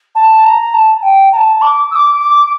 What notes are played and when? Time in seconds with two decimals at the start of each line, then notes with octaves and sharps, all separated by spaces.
0.15 A5
0.44 A#5
0.74 A5
1.03 G5
1.32 A#5
1.36 A5
1.61 D6
1.91 E6
1.95 D6
2.20 D6